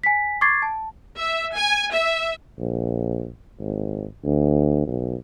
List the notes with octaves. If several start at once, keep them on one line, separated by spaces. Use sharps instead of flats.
G#5 B6
C#6 D6 G#6 A6 C7
A5
E5
G#5
E5
A#1
G#1
D2
B1